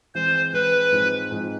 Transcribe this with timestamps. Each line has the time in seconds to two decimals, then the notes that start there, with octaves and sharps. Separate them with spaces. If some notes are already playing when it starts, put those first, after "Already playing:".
0.15 E3 G#3 C4 C5
0.53 E3 G#3 C4 B4
0.92 G#2 F3 G#3 C4 D#4
1.31 G#2 F3 G#3 C4 D#4